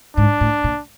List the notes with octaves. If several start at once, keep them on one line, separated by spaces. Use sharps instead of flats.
G#2 D4
A2
A#2